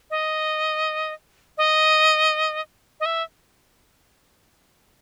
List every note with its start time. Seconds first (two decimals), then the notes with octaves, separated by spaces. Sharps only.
0.10 D#5
1.58 D#5
3.00 D#5
3.06 E5